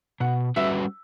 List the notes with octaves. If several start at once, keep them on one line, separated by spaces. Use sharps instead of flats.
B2 F#5
G3 C#4 F#4 B4 E5